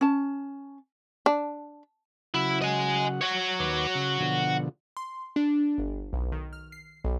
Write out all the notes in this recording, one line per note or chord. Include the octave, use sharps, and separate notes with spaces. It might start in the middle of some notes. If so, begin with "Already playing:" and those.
C#4 A5
D4
C#3 F#3 E4 F#5
D#5 G#5
F#4 C#5
D#2 B4 D6
C#3
B2 D3 F3
C6
D4
G1
B1
D#3
F6
C7
B1